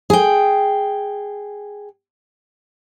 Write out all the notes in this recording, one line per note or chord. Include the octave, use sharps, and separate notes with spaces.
G#4 G5